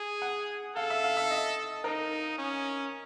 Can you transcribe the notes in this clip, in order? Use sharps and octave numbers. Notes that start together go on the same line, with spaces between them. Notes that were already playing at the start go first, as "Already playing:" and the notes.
Already playing: G#4
F#5
A4 F5
E5
F5
E5
D#5
D#4 A#4
C#4